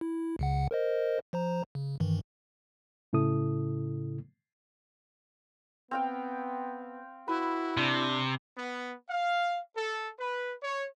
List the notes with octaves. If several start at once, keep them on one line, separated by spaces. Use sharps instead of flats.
E4
C#2 C#3 F#5
A#4 C5 D#5
F3 C5 A#5
C#3
G2 D#3 E3
A2 C#3 E4 A4 D#6
B3 C4 F5 G5
E4 F#4 B4
C3 D4
B3
F5
A4
B4
C#5